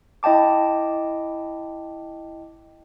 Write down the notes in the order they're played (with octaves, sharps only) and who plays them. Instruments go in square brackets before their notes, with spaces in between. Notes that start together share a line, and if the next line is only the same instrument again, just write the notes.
[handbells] E4 D#5 G5 A5 D6